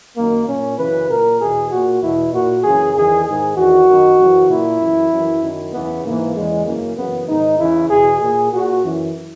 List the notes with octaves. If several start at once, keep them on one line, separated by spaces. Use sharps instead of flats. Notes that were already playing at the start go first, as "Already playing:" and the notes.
F#2 D#3 A#3
A#2 C#4
F#2 C#3 E3 B4
A#2 A#4
E2 B2 G#4
A#2 F#4
E2 B2 E4
A#2 F#4
F#2 C#3 E3 G#4
E2 D#3 G#4
G#2 D#3 G#4
E2 D#3 F#4
F#2 D#3
F#2 C#3 E3
A#2 E4
F#2 E3
F#2 E3
F#2 D#3
E2 C#3 E3 B3
G#2 E3 A#3
E2 C#3 E3 G#3
F#2 C#3 E3 A#3
F#2 C#3 E3 B3
G#2 D#3 D#4
E2 C#3 E3 E4
E2 B2 G#4
A#2 G#4
A#2 F#4
F#2 E3